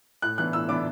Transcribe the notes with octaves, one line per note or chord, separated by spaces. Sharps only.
A2 F#6
E3 B3 D4 F#6
A2 E6
E3 B3 D4 D6